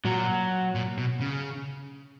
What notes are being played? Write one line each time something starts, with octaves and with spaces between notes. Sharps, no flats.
A#2 F#3
A#2
B2
C#3